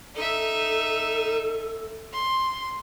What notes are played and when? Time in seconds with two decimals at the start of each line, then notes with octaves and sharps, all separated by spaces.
0.16 D#4 A4 E5
2.13 C6